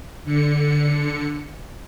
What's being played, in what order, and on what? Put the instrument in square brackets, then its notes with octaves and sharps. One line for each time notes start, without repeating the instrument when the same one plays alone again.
[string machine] D3 C#7